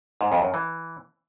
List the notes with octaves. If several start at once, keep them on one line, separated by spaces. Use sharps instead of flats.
G#2
F2
F#2
E3